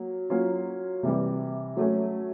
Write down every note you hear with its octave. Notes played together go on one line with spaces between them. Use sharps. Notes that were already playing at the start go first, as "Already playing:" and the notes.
Already playing: F#3 A#3
F#3 A#3 C#4 F4
C3 E3 G3
F#3 A3 C#4